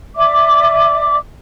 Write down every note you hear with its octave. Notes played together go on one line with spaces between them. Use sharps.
D5 E5 D6